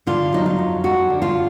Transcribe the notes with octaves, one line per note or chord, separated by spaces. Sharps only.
D3 F4
F#3 D#4
F4
F2
F2 F#4
D3
F4